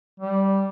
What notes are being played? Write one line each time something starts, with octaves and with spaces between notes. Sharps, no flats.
G3